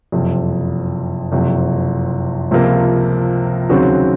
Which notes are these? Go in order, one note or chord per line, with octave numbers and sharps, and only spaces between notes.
F#1 F2 C3
F#1 F2 C3
C#2 C3 F3 A#3
D#2 C#3 F#3 C4 F#4